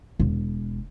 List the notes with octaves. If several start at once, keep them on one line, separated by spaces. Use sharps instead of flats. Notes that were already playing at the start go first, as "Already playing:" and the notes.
E1